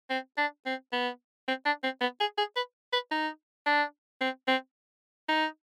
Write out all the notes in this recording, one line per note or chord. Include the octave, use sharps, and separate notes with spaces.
C4
D4
C4
B3
C4
D4
C4
B3
G#4
G#4
B4
B4
D#4
D4
C4
C4
D#4